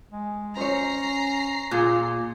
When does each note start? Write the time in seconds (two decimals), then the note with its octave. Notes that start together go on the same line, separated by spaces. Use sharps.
0.12 G#3
0.57 C#4 C5 C#5 A#5 C7
1.71 A#2 F4 G#4